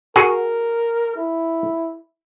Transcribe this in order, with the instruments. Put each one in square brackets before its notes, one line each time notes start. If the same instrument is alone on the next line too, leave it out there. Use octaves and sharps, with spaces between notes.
[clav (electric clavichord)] F#4 G#4 [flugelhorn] A#4
[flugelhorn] E4